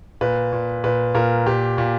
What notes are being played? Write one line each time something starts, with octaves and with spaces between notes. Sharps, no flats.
A#2 B4
A#2
A#2 B4
A#2 A#4
A#2 G4
A#2